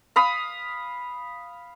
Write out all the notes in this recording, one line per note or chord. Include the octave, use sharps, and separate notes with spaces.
F5 B5 D#6